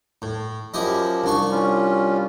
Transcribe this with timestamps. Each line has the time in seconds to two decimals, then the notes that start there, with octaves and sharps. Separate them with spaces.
0.22 A2
0.74 F#2 F3 E4 G4 D#5
1.24 C2 D4 C#6
1.51 G3 C#4 F4